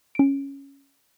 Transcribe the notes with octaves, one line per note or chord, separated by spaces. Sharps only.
C#4 D7